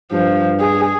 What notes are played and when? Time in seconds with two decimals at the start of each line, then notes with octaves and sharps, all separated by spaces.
0.12 G2 F3
0.60 G#4